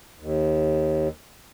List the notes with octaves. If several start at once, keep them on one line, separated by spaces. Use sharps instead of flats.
D#2